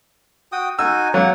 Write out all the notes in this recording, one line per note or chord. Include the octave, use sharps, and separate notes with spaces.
F#4 G5 D#6
D#4 F#4 G#5 E6
F#3 A#3 F#5